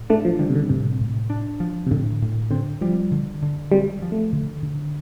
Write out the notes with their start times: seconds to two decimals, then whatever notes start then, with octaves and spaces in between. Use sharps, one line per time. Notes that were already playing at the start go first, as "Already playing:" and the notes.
Already playing: A2
0.10 A3 D4
0.25 F3
0.39 D3 G3
0.50 C3
0.55 D3
0.69 A2 C3
1.01 A2
1.30 D4
1.60 F3
1.87 C3
1.91 A2 D3
2.21 A2
2.51 D3 C4
2.81 F3 G3
3.11 D3
3.42 D3
3.72 G3 C4
4.02 F3
4.12 A3
4.33 D3
4.62 D3